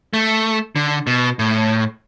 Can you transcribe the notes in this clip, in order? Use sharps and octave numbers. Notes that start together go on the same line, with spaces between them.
A3
D3
B2
A2